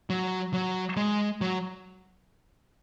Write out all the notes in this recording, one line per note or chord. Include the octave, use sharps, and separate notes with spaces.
F#3
F#3
G#3
F#3